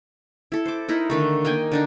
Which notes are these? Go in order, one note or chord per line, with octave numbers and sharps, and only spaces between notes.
E4 A4
C5 D6
D#4 E4 A#4
D3 D#3 A3
A#3 D#4 G5 G#5
D3 D4 D#4